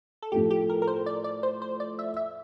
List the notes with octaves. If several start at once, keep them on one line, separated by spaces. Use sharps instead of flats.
A4
A2 F3 A3 G4
G4
A#4
A#4
C5
D5
D5
C5
C5
D5
E5
E5